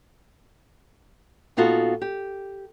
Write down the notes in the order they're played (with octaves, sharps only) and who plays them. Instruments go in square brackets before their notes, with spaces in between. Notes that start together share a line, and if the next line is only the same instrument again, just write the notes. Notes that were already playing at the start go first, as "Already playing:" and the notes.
[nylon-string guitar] A#2 B3 D#4 F4 F#4 A4
G4